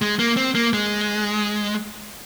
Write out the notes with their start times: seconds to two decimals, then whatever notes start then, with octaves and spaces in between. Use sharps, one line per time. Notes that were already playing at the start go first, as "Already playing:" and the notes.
0.02 G#3
0.19 A#3
0.37 C4
0.55 A#3
0.73 G#3